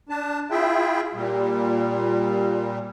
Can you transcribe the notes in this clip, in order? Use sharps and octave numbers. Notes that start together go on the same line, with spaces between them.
D4 A5
E4 F4 G#4 E5 G5
A#2 G3